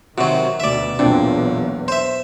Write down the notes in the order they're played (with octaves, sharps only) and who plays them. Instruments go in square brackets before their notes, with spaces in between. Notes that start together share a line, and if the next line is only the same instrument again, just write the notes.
[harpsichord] C3 F#3 [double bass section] D#3 [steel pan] F#4 C5 C#5
[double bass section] D2 B2 [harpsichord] D5 E5
[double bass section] B1 E2 [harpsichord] A#2 [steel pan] C4 D4
[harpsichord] C5 E5